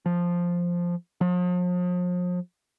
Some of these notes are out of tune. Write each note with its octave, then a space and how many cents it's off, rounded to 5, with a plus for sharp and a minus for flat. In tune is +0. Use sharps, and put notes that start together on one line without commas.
F3 +0
F3 +40